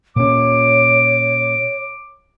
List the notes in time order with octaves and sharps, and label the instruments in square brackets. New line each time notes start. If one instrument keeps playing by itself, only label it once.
[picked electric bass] A#2 C#4 [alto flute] C#5 [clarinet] D6